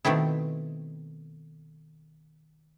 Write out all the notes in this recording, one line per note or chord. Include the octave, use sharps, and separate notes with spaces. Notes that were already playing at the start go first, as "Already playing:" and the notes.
B2 D#3 A3 C4 E4